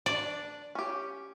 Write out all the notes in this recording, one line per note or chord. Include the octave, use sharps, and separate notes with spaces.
D4 D5
C#4 G4